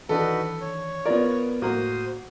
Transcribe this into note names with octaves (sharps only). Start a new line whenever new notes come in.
D#3 E3 D4 D#4 F#4 A4 B4
C#5
B3 F4 A#4 D5
A2 A3 A#3 F#4 C5 D#6